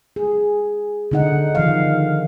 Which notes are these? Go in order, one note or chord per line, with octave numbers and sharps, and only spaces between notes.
G#4
D3 D#4 F#5
D#3 F3 F5